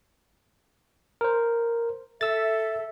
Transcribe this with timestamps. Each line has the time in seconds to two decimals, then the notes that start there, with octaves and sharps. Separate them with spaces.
1.21 A#4 C5
2.21 A4 E5 E6 A6